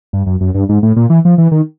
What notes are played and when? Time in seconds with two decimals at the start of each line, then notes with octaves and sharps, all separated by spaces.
0.13 G2
0.26 F#2
0.41 F#2
0.54 G2
0.69 G#2
0.83 A2
0.96 A#2
1.10 E3
1.25 F3
1.38 E3
1.52 D#3